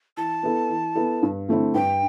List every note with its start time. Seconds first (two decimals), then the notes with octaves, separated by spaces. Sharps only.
0.17 E3 A5
0.43 B3 E4 A4
0.70 E3
0.95 B3 E4 A4
1.23 G2
1.48 D3 A3 C4 E4
1.74 G2 G5